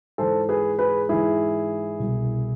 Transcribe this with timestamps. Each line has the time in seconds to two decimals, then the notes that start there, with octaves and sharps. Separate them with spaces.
0.18 G#2 E3 A4 C5
0.49 G#4 B4
0.79 G#4 B4
1.09 G#2 E3 E4 G#4
2.00 C2 B2